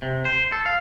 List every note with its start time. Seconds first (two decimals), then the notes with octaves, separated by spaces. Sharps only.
0.02 C3
0.25 C5
0.52 A4
0.66 F5